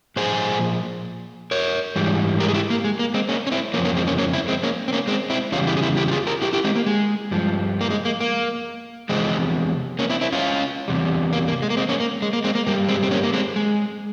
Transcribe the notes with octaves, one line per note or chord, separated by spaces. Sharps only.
A#2 F3 G#4 C5
A#4 C#5
G#2 E3 G3
G4 A#4
G#4
E4 G4
A#3
G#3
A#3
G#3 C4
A#3 C#4
C#4
C4 E4
F2 C#3 F3 A#3 C#4
A#3 C#4
G#3 C4
A#3 C#4
A#3 C#4
C4 E4
G#3 C4
A#3 C#4
C4
A#3 C#4
G#3 C4
C4 E4
E2 C#3 G3 C#4 F4
E4 G4
G#4
E4 G4
E4 G4
G4
F4 G#4
G4 A#4
E4 G4
E4 G4
G#3 C4
A#3
G#3
G2 F3
A#3
G#3
A#3
A#3
E2 C3 F3 G#3 C4
A#3 C#4
C4 E4
C4 E4
C#4 F4
E2 C3 G3
A#3
A#3
G#3
A#3
G#3 C4
A#3 C#4
A#3
G#3
A#3
G#3 C4
A#3
G2 G3 A#3
G#3 C4
C4
A#3 C#4
A#3
G#3 C4
G#3